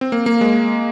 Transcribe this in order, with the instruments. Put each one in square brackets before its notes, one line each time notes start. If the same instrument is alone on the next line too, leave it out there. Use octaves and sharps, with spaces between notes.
[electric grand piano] C4
A#3
A#3
G#3